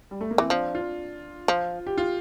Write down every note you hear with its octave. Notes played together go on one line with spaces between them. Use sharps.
G3
A3
A#3
E3 C4
F3 D4
F4
F3
G4
F4